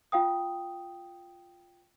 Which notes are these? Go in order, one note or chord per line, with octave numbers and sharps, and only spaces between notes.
F4 F5 G5 D#6